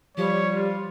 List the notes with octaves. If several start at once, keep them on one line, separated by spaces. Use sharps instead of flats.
F3 G3 G4 C#5
F4